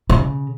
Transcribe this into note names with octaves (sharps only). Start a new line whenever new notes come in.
C#3